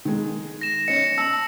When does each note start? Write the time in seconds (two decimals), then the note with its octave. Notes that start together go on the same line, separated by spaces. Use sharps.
0.05 D#3 G#3
0.61 A#6 E7
0.88 C#4 D#5 C#7
1.18 A5 E6